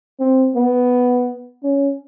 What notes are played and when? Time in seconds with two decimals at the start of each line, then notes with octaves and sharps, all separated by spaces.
0.20 C4
0.56 B3
1.63 C#4